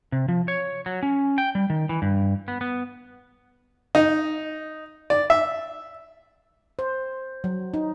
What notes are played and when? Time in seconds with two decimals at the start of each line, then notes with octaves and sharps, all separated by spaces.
0.12 C3
0.29 F3
0.48 C#5
0.86 F#3
1.03 C#4
1.38 G5
1.55 G3
1.70 D#3
1.89 E3
2.02 G2
2.48 B3
2.61 B3
3.95 D#4
5.10 D5
5.30 E5
6.79 C5
7.44 F#3
7.74 D#4